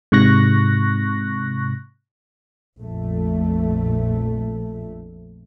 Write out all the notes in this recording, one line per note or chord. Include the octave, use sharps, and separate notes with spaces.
G#2 C3 C#6 F#6 A#6
A#1 F2 A3